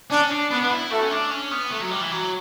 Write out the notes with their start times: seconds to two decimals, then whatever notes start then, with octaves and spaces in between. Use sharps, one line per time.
0.10 C#4 D4
0.30 D4
0.50 B3 D4
0.62 D4
0.70 E4
0.90 A3 F#4
1.02 C#4
1.11 D4
1.30 C#4
1.51 B3
1.71 A3
1.81 F#3
1.91 G3
2.01 E3
2.11 F#3